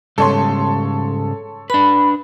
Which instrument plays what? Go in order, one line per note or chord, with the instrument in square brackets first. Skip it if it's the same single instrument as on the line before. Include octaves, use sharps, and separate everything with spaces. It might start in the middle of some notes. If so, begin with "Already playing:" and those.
[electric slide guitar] G#2 C#3 G3 [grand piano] A4 C#5 C6
[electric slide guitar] D4 B4 [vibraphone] B5